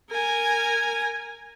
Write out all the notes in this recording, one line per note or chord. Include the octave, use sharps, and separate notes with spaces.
A#4 G#5